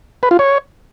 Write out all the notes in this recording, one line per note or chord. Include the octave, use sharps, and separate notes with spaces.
B4
F4
C#5